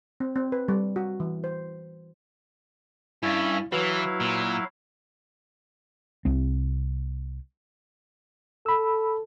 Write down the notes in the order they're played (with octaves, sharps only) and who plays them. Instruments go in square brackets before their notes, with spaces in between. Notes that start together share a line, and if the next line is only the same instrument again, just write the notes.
[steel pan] C4
C4
B4
G3
F#4
E3
C5
[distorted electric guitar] G2 [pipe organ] C#4 E5 G#5 [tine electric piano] E4 F5 A6
[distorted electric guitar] E3 [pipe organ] F#3 E4 F5 [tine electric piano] F#4 B4 C#5
[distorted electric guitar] A#2
[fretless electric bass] C2 C4
[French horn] A4 [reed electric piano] B5 E6